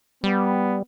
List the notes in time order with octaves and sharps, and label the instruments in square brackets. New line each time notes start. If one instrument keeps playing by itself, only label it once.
[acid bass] G3 [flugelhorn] B3